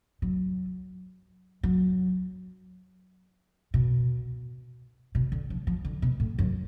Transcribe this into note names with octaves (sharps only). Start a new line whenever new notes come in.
F#3
F#3
B2
B2
D3
F3
F3
D3
B2
A2
F#2